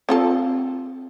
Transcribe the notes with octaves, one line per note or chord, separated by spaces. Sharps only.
C4 F4 A4